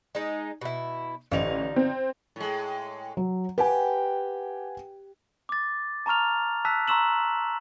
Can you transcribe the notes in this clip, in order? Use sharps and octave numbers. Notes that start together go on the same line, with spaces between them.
G#3 D#4
B2 E4
A1 D3 F3 D#4 F7
C4
A2 G#3
F#3
G4 B4 F#5 G#5
D6 A6
A5 A#5 C#6 F6 F7
A5 E6 F#6 B6
A#5 C6 C#6 E6 E7 F#7